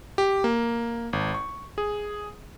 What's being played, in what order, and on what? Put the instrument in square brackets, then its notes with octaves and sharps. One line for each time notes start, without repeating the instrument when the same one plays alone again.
[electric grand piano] G4
A#3
G#1
C#6
G#4